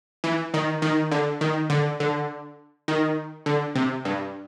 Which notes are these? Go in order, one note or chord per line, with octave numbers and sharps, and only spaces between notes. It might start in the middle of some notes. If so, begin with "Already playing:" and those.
E3
D#3
D#3
D3
D#3
D3
D3
D#3
D3
C3
G2